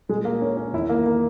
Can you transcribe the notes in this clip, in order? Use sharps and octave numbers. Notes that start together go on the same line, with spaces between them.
A#2 G#3
A#3
C#4
C#4
E2 D#3 E4
A#3
A#3